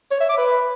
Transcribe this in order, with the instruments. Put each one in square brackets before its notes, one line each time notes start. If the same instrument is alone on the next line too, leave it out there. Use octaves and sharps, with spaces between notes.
[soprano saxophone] C#5
E5
D6
B4